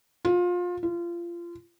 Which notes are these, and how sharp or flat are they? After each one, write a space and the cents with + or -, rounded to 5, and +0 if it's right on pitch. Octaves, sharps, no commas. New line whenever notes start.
F4 +25
F4 -25